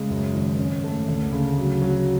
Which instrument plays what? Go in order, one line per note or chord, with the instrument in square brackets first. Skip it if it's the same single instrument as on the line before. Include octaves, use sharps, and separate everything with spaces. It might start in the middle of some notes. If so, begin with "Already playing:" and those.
Already playing: [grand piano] C#3 G#3
F#2
G#1
C#4
A3
D2
C#3
F#3
F#3